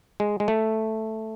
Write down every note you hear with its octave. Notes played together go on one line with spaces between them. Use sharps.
G#3
G#3
A3